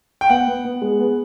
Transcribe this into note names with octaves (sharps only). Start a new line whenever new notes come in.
G5
B3 F#5
B3
B3
G#3
B3